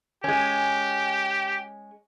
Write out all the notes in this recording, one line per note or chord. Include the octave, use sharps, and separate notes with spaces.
G#3 C#4 G4